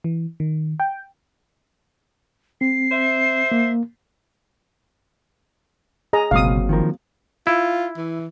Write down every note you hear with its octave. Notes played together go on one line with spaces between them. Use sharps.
E3
D#3
G5
C4 C7
C5 E5
A#3
G#4 D#5 A#5
G1 C#2 B2 F#3 A#3 C4 F5 D#6
D#3 F3 A#4
E4 F4
E3